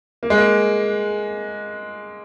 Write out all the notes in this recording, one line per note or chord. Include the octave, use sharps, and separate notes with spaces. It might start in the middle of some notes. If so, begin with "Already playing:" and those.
A#3
G#3
A#3